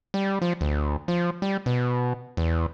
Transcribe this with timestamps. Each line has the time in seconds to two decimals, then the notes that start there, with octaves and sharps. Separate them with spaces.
0.14 G3
0.42 F3
0.61 D2
1.08 F3
1.42 G3
1.66 B2
2.37 E2